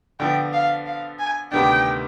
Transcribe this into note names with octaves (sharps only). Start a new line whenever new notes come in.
D3 F3 B3 G5
F5
F5
G#5
D2 C3 D#3 B3 D4 G5